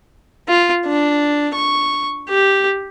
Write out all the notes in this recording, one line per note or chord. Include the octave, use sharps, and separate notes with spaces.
F4
D4
C#6
G4